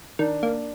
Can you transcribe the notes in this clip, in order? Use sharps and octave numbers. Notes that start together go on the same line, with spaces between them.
D#3 D4
A#3